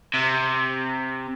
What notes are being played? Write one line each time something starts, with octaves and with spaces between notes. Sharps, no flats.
C3